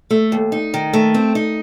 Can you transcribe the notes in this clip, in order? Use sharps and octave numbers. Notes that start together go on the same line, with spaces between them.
A3
D#2
D#4
D#3
A3
C4
D#4